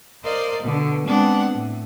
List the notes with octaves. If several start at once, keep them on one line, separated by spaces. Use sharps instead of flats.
A#4 C5 D5 D#5 F5
B2 D3 B3
G#3 B3 C4 D4 F#5
A2